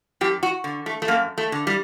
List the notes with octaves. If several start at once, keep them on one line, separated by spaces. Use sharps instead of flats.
F#2 G4
F#4
D3
A3
A3
F#2 A#3
A3
D3
G3